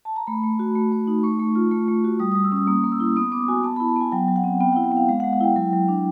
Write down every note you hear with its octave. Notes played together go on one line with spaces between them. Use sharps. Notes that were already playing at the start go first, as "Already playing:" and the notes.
A5
A#5
A3 B5
A3
F#4
A3
A3
D#4
A3 C#6
A3
F4
A3
A3
F#4
G3 D#6
G3 D#6
E6
C#4 D#6
A#3 D#6
A#3
E6
E4
B3 D#6
B3 D6
F#4 G#5
B3 A5
E4 B5
A5
B3 G#5
F#3 G5
F#3
F#5
C4
B3 G5
E4 F#5
G5
B3 F5
G#3 F5
G#3 F#5
F#5
E4 G5
F#3
F#3
D4